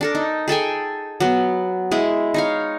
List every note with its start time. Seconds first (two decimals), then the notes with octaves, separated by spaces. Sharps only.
0.01 D4 A4 A#4
0.15 D#4
0.48 G#4 A4 G5 G#5
1.20 F#3 B3
1.91 G#3 E4
2.34 D#4 C#5 F5